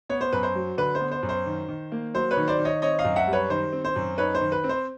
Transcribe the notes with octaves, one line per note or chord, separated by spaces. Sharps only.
B3 C#5
C5
F#2 B4
C5
F#3
D3 B4
C5
B3
C5
F#2
C5
D#3
D#3
A#3
F#3 C5
B4 C#5
D#3
C5 D5
D#3
C#5 D#5
C4 C#5 D#5
D#5 F5
F#2
E5 F#5
G3
B4 C#5
D#3 C5
C4
C5
F#2
D#4 B4 C#5
C5
D#3
B4
C4
C5